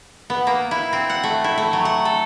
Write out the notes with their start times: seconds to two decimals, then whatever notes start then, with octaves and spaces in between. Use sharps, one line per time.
0.30 B3
0.47 A#3
0.71 E4
0.93 C4
1.10 F#5
1.23 A3
1.44 E4
1.58 A3
1.73 F#3
1.85 F#5
2.05 A4